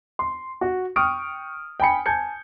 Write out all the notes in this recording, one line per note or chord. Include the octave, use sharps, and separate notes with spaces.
C6
F#4
G5 C#6 D#6 F6 D7
G5 G#5 B5 C#7
G#5 A5 G6 G#6 C#7